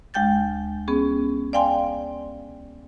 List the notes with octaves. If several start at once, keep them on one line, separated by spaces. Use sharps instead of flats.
D2 G#3 G5 G6 A6
B3 C#4 G#4
D5 F5 G5 G#5 C6